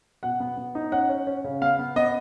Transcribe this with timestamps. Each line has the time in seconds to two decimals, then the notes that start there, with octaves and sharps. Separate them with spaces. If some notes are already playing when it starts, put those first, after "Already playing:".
0.23 B2 F#5
0.40 B3
0.57 B3
0.75 D#4
0.92 C#4 F#5
1.09 C#4
1.27 C#4
1.44 C#3
1.61 B3 F5
1.79 B3
1.96 B3 D#5